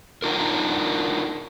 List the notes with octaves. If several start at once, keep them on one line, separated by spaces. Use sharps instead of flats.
D4 D#4 F4 A#4